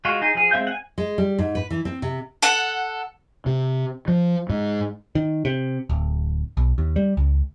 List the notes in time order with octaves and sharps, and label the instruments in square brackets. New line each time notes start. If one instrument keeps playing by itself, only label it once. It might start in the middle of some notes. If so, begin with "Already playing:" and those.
[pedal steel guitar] G#3 F4 F#4
D#4 G#4
F3 G#4
G#3 C4 E5 F5 G6
F#5 G#5
[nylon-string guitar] G#3
G3
G#2
B4
E3
C4
C3
[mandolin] A4 F#5
[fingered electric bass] C3
F3
G#2
[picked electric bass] D#3
C3
D1
B1
D#2
G3
C#2